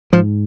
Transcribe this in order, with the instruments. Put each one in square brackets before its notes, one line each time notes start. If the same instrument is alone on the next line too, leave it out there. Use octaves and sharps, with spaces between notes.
[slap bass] G#2 F3